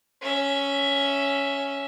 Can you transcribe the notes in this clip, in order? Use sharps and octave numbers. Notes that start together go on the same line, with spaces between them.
C#4 E5